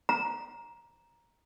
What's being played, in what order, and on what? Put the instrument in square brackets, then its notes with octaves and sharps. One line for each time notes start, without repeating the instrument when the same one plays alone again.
[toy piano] A#5